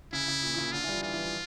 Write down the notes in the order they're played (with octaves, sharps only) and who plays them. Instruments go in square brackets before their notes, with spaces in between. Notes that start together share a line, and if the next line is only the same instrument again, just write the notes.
[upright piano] C#3 [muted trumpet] E4
[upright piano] C#3
A#2
A#2
C#3
[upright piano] D3 [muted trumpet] F4
[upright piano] E3
G3
F3
[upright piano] E3 [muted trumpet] F4
[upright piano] E3
F3